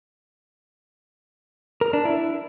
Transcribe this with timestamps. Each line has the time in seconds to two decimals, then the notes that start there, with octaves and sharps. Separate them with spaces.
1.81 A#4
1.93 D4
2.05 E4